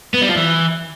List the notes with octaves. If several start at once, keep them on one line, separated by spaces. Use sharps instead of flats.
B3
G3
F3
E3